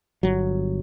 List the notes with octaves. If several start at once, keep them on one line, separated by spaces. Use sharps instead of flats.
G1 F#3